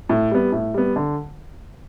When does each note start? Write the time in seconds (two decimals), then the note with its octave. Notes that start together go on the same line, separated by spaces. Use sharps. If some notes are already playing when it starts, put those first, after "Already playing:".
0.09 A2
0.31 G3 B3
0.52 A2
0.74 G3 B3
0.96 D3